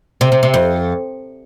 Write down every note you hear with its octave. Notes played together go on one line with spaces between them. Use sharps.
C3
C3
C3
F2